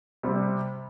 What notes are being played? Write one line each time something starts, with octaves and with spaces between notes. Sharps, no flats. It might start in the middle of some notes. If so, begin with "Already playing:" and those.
C3 G3 C4